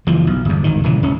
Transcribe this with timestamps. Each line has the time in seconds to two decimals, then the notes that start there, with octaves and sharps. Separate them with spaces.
0.07 F#1 E3 F3
0.27 B1
0.45 G1 E2
0.64 G#1 D#3
0.84 D#1 C#3 E3
1.03 D1 C#4